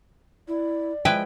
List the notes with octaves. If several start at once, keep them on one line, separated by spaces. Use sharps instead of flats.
E4 D5
F3 G#3 E4 B4 G5